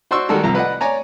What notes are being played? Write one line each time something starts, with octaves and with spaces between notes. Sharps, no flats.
F#4 C5 D5 C6 C#6 E6
D#3 G3 G#3 F#4 A4 A#4
C2 F3 A#5
B4 D5 D#5 F#5
C#5 D5 G#5 A#5